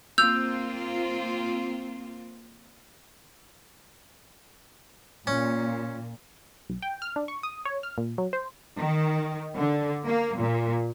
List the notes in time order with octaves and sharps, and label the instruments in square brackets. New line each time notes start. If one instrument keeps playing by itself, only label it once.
[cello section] A#3 C4 F4 [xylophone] E6 G6 F7
[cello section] A#2 [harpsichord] C#4
[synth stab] B1
G5
F6
D4
C#6
D#6
C#5
F6
A#2
F#3
C5
[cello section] D#3
D3
A#3
A#2